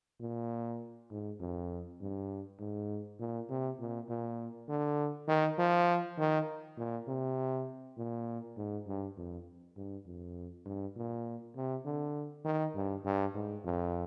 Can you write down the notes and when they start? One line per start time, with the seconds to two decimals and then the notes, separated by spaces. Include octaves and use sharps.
0.21 A#2
1.10 G#2
1.40 F2
2.01 G2
2.60 G#2
3.19 A#2
3.50 C3
3.79 A#2
4.09 A#2
4.69 D3
5.28 D#3
5.58 F3
6.18 D#3
6.78 A#2
7.08 C3
7.97 A#2
8.57 G#2
8.87 G2
9.17 F2
9.76 G2
10.06 F2
10.65 G2
10.96 A#2
11.55 C3
11.85 D3
12.45 D#3
12.75 G2
13.05 G2
13.34 G#2
13.64 F2